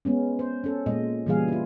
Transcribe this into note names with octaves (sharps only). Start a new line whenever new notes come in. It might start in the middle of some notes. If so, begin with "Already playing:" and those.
G#3 B3 C#4
C5
C#4 A4
A#2 G#3 D#5
A#2 C#3 E3 G3 G#4 F5
E4 F4